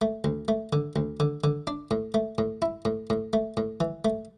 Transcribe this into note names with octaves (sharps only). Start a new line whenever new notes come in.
A3
D2
A3
D3
D2
D3
D3
D4
A2
A3
A2
E4
A2
A2
A3
A2
E3
A3